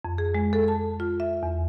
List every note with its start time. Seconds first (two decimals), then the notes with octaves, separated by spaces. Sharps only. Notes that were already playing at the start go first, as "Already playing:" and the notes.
0.05 F2
0.18 G#4
0.34 G#3
0.53 A4
0.68 A5
1.00 F4
1.20 E5
1.43 E2